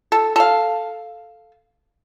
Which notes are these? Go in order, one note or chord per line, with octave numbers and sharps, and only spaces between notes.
A4
A4 F5